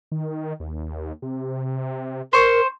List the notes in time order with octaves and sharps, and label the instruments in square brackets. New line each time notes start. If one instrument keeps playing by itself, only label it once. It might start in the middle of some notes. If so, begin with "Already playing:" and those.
[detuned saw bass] D#3
D#2
C3
[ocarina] A#4 [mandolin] C5 C#6